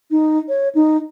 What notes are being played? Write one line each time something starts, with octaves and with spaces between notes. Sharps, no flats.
D#4
C#5
D#4